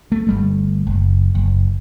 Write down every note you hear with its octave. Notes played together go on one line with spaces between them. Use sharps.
A3
G1 G3 A3
F#1
F#1